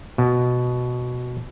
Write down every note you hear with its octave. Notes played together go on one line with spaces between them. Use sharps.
B2